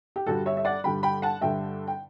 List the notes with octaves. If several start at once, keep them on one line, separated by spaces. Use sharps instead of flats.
G4
G2 D3 G3 F#4 A4
C#5 E5
E5
D5 F#5
G2 D3 G3 G5 B5
G5 B5
F#5 A5
G2 D3 G3 E5 G5
G5